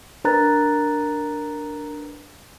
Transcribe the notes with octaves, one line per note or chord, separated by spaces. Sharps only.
D4 A#4 B4 A#5 F#6 A6